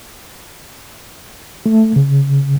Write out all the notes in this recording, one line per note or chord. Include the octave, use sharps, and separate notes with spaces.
A3
C#3